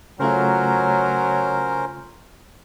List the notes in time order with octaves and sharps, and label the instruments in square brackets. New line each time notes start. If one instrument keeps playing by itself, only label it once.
[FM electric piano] C#3 A3 F4 [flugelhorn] F#3 [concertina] C#4 A#4 C5